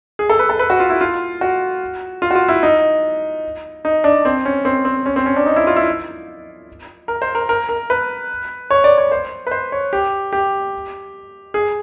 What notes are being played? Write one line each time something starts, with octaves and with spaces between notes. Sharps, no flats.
G#4
A4
B4
A4
B4
F#4
F4
E4
F4
F#4
F4
F#4
F4
E4
D#4
D#4
D4
C4
C#4
C4
C4
C#4
C4
C#4
D4
D#4
E4
F4
E4
A#4
C5
A#4
A#4
A#4
B4
C#5
D5
C#5
C5
B4
C5
C#5
G4
G4
G#4